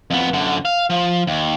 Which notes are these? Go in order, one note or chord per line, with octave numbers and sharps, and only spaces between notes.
F2 B3
F#2 D3
F5
F3
D#2